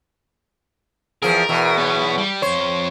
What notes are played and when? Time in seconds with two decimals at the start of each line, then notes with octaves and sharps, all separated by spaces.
1.22 E2 F3 G#4 A#4
1.49 E2 B2
1.77 B3 C#5
2.18 G3
2.42 F2 C5 C#5